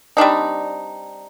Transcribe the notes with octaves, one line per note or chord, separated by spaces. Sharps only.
G3 C4 D4 D#4